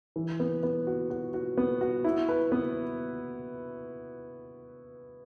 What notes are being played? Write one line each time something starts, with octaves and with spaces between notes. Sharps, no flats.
E3
B3
B3
F#4
F#4
F#4
B3
F#4
E4
B4
B3